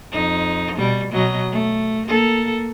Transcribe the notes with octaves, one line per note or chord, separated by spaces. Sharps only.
F2 D#4
B2 G3
B2 F#3 D#5
A3
A#3 A4